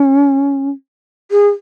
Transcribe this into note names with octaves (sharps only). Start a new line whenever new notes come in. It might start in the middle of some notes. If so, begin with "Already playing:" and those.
Already playing: C#4
G#4